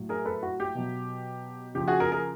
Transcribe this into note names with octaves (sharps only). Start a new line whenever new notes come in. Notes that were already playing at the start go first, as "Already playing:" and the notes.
Already playing: A2 F#3
G#4 A#4
A4 B4
F#4
G4
B2 F#3
C#3 F3 G4
F#4 G#4
G#4 A#4
G#4 A#4